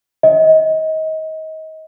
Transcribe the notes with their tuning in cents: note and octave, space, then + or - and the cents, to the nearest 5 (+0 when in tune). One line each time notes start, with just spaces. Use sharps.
D#5 +30